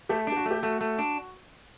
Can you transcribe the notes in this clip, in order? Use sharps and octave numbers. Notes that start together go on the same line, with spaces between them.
A3 G4
D4 G4
F#4
A3
G4
A3 F#4
A3
D4